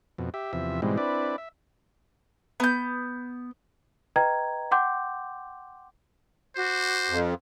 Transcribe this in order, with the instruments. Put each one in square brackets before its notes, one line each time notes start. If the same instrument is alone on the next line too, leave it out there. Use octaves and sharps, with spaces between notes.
[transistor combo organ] F2 B2
G4 E5
E2 C3 F3 E5
G#2 B2 E3 G3 G#3 C4
C4 D4 E4 B4 D5
E5
[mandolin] B3 G6
[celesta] B4 D#5 G5 A#5 G#6
F#5 G5 C6 D6 G6
[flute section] F#4 D6 [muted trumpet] C5
[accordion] F2